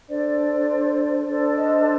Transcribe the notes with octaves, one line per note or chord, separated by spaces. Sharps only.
D4 A4 C5 D5
D4 A4 C5 D5
D#5